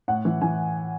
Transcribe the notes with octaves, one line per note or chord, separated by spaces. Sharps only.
A2 F#5
E3
E3 G#5